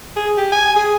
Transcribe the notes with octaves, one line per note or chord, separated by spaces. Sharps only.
G#4
G4
G#5
G#4